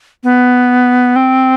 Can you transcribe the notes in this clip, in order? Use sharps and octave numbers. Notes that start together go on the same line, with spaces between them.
B3
C4